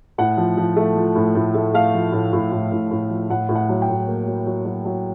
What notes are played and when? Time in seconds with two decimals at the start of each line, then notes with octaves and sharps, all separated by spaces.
0.18 A2 F#5
0.37 F3
0.57 F3
0.76 A3
0.96 F3
1.16 A2
1.35 A2
1.54 A3
1.74 A3 F5
1.94 F3
2.12 A2
2.33 A2
2.52 A2
2.71 A2
2.91 A2
3.10 F3
3.30 A2 F#5
3.49 A2
3.55 F#5
3.69 F#3
3.82 G5
3.89 A2
4.07 A#3
4.27 F#3
4.47 F#3
4.65 F#3
4.85 F#3